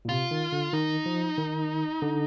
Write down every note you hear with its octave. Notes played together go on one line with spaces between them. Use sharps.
A#2
C3 F4
D#3
D3
D#3 D#4
F3
D#3
D3